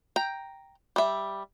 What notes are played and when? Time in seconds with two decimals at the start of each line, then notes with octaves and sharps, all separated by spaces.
0.16 G5 A#5
0.96 G3 E5